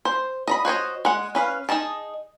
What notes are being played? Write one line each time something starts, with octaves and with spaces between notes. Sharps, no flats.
C5
D#5 A#5 B5
F#4 C5 C#5 D#5
G#3 F#5
C#4 B4 E5 F5
D#4 G#4 D#5 A5